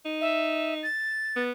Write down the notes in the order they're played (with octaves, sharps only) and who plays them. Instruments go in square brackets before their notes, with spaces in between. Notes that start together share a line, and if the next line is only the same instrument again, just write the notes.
[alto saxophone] D#4
[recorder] E5
A6
[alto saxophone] B3